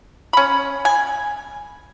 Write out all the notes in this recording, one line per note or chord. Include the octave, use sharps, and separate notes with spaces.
C#4 B5
G#5